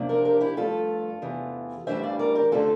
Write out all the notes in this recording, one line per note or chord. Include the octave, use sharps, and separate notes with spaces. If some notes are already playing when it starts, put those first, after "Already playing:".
Already playing: C3 F3 A#3 D4
A#4 D5
G4 A#4
E4 G4
G2 F3 A3 F4 A4
E2 C3 E3
A2 E3 G3 A#3 D4 C5 E5
D5 F5
A#4 D5
G4 A#4
D3 A3 C4 F4 A4